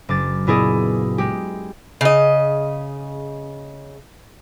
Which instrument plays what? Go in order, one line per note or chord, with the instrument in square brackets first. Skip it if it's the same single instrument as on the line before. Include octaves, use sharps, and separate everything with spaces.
[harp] F#1 D6 A6
A#2 B3 E4 G#4 D5 D#5
G#3 G4
[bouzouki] C#3 D#5